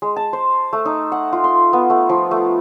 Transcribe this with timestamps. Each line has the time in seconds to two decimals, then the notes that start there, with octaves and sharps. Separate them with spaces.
0.02 G#3
0.16 A5
0.33 C5
0.73 A3
0.85 D#4
1.12 F#5
1.33 F4
1.44 C6
1.73 B3
1.90 A3
2.09 F3
2.31 A3